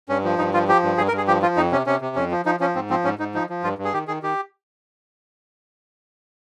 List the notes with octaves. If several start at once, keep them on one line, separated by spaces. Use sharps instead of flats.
G2 C#4
F3
G2 D#4
F3 F4
F3 G4
G2
G2 G#4
A#4
G2
G#4
F3 G4
F3 F4
F2 D#4
C3 C#4
C3 C#4
C3
F2 C#4
F3
F3 D#4
F3 C#4
G#2 C4
F3 C4
G#2 C#4
G#2 D#4
F3 D#4
F3
G2 F4
G2
G#4
D#3 G4
D#3 G#4
D#3 G4